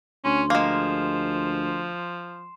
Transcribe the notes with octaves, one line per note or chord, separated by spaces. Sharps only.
D2 C#4 C6
F3 G#3 A#3 C7 E7